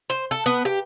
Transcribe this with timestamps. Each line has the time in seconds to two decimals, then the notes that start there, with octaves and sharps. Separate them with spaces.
0.10 C5
0.31 A4
0.46 B3
0.65 G4